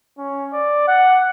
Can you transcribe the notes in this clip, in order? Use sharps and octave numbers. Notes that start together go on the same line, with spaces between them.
C#4
D5
F#5